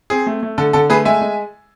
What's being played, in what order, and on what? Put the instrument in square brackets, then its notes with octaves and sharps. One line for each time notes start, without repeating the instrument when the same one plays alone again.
[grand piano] C4 G#4
A3
A3
D3 A4
D3 A4
A3 G#4 B4
G#3 E5 G#5
G#3